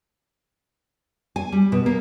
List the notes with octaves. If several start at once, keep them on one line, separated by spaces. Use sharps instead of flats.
G#5
G3
B2
A#3